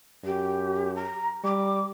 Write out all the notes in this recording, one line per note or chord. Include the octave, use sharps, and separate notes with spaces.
F#2 G4
A#5
G3 D6